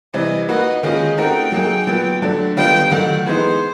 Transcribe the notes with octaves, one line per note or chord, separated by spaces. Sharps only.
C3 E3 G3 C4 D#5
A#3 D#4 F#4 B4 D#5
D#3 G#3 C#4 F4 D#5
A3 C4 D#4 F#4 A#4 G5
F#3 A#3 D#4 G#4
A#2 F#3 B3
D3 F#3 A3 D4
D#3 G3 B3 D4 F4 G5
D#3 F#3 A3 F#5
E3 G#3 B3 D#4 C5